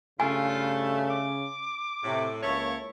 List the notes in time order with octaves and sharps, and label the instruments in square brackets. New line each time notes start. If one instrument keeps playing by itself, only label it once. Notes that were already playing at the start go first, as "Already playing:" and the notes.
[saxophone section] G2 A3 [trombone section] C#3 [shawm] F4 [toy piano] G#5
[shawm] D6
[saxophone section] A2 [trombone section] C3
[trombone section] C#2 A#3 [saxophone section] E4 A4 C#5